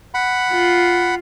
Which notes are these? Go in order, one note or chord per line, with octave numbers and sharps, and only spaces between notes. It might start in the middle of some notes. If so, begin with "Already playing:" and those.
F#5 B5
F4